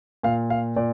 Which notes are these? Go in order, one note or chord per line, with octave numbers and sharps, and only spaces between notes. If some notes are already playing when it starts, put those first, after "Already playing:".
A#2 F5
F5
A#2 D5